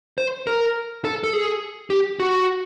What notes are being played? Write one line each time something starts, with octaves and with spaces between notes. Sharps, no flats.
C5
A#4
A4
A4
G#4
G4
F#4